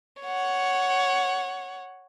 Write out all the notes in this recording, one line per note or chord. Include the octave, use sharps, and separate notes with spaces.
C#5 F#5